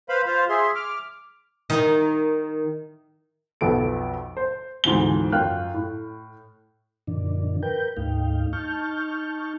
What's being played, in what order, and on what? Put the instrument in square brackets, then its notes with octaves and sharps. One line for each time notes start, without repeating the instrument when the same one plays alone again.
[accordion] B4 C5 F5 B5
F4 C5 F5
G#4 E5 C6
D6 F6
[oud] D#3
[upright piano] B1 F2 B3 A4 D7
C5
D2 G#2 E3 F3 C4 G7
F#2 F4 G5 F6 F#6
A2
[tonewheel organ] F#2 A#2 D3 D#3 F3 D4
A#4 B4 G5 G6
D2 G#2 A3 D#4 F5 G5
D#4 A5 C#6 F6 G6